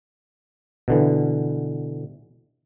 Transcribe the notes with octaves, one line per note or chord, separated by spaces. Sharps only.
B2 D3 E3